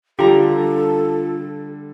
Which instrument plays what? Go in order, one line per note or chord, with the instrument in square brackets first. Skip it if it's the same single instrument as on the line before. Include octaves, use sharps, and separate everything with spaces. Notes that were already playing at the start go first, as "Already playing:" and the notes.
[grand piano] D3 G3 [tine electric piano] F4 [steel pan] G4 A#5 [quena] A4